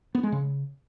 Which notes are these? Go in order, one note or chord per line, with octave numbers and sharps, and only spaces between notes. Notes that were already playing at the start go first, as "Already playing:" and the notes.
B3
G#3
C#3